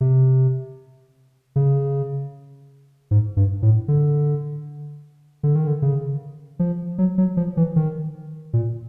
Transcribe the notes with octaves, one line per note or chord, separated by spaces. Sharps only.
C3
C#3
G#2
G2
A2
D3
D3
D#3
D3
C#3
F3
F#3
F#3
F3
E3
D#3
A#2